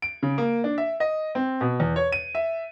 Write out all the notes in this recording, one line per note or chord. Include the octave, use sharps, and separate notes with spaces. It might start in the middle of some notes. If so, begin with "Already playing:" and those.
D7
C#3
A#3
D4
E5
D#5
C4
B2
E2
C#5
D#7
E5